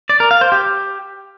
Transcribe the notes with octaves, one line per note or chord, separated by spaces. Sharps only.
D5
A#4
F5
C5
G4